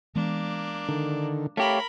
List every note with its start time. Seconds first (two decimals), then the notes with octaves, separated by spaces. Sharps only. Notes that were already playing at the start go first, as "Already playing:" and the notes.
0.16 E3 G#3 A#3 B3 D4
0.89 D3 D#3
1.57 A3 G4 A#4 C#5 F5 B5